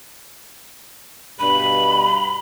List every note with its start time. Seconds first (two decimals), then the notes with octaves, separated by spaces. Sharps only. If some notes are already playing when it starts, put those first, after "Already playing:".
1.39 G2 B2 B5